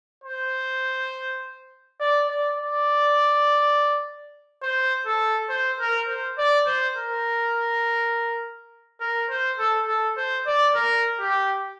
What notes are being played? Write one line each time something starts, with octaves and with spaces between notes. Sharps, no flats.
C5
D5
D5
D5
C5
A4
C5
A#4
C5
D5
C5
A#4
A#4
C5
A4
A4
C5
D5
A#4
G4